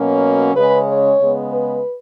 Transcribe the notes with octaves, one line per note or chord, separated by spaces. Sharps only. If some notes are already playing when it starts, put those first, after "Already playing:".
Already playing: B2 F#3 A#3 C#4
C#3 G#3 C#4 B4
C#5
C#3 G#3 B3
B4